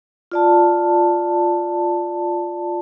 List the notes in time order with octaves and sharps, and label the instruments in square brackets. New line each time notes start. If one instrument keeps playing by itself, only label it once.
[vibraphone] F4 D5 A5